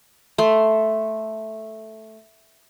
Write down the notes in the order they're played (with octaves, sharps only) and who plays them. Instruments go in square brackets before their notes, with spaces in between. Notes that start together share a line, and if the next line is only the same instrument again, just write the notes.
[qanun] A3 C6